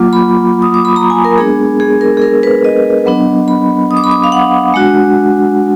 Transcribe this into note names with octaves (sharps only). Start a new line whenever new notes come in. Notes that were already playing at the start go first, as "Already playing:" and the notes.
Already playing: F#3 A#3 F4 D6
B5
D#6
D6
B5
A#5
G#5
A#4
G#3 B3 D4 G#4
G#4
A#4
G#4
A#4
B4
D#5
F#3 B3 D4
B5
D#6
D6
B5
D6
F5
F#5
G#3 D4 F#4